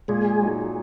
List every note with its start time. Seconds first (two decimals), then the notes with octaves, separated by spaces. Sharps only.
0.08 A#2 G#3 G#4
0.41 F#3 D#4